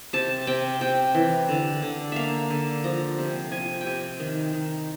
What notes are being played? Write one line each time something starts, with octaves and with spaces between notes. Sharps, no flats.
C3 A5
C3 G5
C3 G5
E3
D3
D3
A#3 E5 F5
D3
F3 A#5
C3
F3 G#5
C3 G5 G#5
D#3
D#3